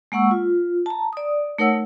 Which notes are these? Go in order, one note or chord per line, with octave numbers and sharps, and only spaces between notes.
G#3 A#3 F#5 C#6 E6
F4
A5 A#5
D5 D#6
A3 D#4 A#4 C#5 F#5 E6